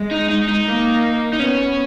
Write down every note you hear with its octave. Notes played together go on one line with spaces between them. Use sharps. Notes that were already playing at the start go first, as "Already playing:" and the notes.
Already playing: G#3
D#4
D#4
D#4
A#3
D#4
B3 C#4